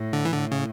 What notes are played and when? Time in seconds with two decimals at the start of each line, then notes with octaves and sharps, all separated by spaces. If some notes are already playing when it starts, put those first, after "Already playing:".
Already playing: A2
0.13 D3
0.25 E3
0.32 A2 D3
0.51 C#3